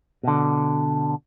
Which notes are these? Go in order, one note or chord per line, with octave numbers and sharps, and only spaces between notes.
B2 D3